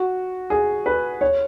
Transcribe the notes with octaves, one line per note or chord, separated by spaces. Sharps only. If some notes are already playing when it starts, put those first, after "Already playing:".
Already playing: F#4
G#4
B4
C#5